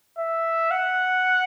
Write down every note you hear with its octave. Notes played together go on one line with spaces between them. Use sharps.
E5
F#5